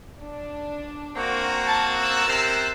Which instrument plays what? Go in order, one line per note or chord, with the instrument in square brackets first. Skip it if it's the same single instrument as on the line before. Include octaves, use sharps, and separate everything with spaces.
[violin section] D4
[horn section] A#3 C4 F#4
[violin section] A5 A6
E6 F#6 A6
[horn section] C3 A#4 C5